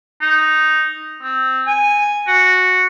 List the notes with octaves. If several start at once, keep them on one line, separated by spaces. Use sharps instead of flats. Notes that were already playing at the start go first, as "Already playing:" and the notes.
D#4
C4
G#5
F#4